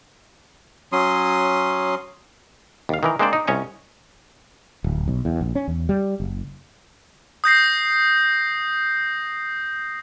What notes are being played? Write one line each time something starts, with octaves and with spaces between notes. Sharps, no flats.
F#3 C#4 C6 D#6
D#2 F5
D#3 E3 A#4
G#3 A#3 C4 D4 C5 D5
D#4
C2 C#4 C#5 D#5 G#5
D1
B1
E2
A#1
C#4
E2
G3
F#1
D#6 G6 A#6 C7